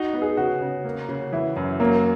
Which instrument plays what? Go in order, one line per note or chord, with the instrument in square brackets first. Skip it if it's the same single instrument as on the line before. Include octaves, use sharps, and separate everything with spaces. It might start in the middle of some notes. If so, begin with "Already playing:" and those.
Already playing: [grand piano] D#4 [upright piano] F#4
[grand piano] B3
[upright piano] G#4
[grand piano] C#3 [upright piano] F#4
[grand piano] C#3
A#3
C#3
[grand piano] E3 [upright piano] E4
[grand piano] F#2
[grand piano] F#3 [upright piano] A#3